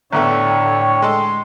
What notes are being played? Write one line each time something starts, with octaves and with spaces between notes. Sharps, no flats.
A1 E2 A2 D3 A3 C#5 G5
G#3 A4 C6